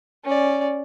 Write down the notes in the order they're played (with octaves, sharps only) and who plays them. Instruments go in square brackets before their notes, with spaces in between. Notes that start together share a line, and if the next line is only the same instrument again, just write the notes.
[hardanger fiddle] C#4 D5